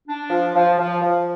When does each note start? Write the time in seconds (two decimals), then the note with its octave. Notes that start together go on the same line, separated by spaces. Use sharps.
0.07 D4
0.29 F3
0.54 F3
0.77 F3
1.01 F3